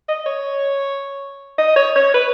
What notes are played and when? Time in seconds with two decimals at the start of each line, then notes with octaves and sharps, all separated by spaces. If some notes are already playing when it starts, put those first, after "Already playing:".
0.08 D#5
0.26 C#5
1.58 D#5
1.76 C#5
1.96 C#5
2.14 B4